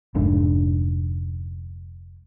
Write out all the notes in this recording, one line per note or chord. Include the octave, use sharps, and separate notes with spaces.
F1 G#2 D4